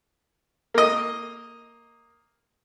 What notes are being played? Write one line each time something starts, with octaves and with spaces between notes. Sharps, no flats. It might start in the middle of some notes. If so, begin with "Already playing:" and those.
A#3 D#5